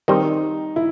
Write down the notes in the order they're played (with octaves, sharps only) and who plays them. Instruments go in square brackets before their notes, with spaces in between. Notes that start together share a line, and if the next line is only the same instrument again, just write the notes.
[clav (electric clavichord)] D#3 G3 C4 [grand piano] D#4
[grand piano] E4